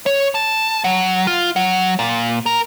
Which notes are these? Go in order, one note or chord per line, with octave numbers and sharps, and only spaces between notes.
C#5
A5
F#3
F4
F#3
A#2
A#4